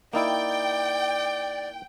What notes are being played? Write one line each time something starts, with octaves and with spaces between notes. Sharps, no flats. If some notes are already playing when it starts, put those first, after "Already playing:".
A#3 D#4 E4 D5 G5